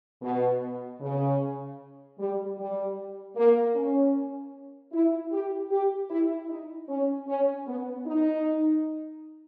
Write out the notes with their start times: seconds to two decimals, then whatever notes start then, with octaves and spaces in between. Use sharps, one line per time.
0.22 B2
1.01 C#3
2.19 G3
2.58 G3
3.36 A#3
3.75 C#4
4.92 E4
5.32 G4
5.71 G4
6.10 E4
6.49 D#4
6.89 C#4
7.27 C#4
7.67 B3
8.06 D#4